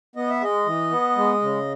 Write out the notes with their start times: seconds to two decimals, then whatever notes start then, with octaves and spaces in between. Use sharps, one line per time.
0.16 B3 D#5
0.30 E5
0.40 G#3 D#5
0.66 E3
0.91 B3
1.16 G#3
1.42 C#3